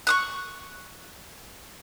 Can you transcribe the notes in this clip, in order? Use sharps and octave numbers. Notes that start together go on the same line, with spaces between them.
C#6 D#6 F#6